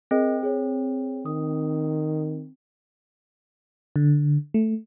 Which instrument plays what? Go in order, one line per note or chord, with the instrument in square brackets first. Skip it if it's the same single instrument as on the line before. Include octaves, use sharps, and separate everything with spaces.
[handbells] C4 [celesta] G#4 A#4 D#5
[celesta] G#4 C#5
[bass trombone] D#3 [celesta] D#6
[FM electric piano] D3
A3